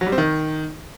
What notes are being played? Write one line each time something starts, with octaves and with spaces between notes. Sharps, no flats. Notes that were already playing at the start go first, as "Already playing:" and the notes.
F#3
G3
C4
D#3